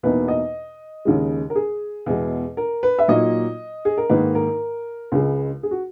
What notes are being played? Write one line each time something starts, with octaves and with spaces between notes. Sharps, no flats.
E2 B2 A#3 D#4 B4
D#5
D#2 C#3 G#3
A#4
G#4
E2 B2 G#3
A#4
B4
E5
A#2 F#3 A#3 D#4 D#5
G#4
A#4
G#2 D#3 A#3 D#4 B4
A#4
C#2 C#3 G#3
G#4
F#4